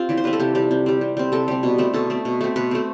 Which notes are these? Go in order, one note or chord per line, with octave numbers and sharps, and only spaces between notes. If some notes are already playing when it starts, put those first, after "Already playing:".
Already playing: C4 F4 G4
E3 D5
C5
G3 C4 B4
A4
C3 G4
G3 C4 G4
C3
G3 C4
C3
G3 C4
C3 A4
G3 C4
B2
A3 C4
B2 A4
A3 C4
B2
A3 C4
B2 B4
A3 C4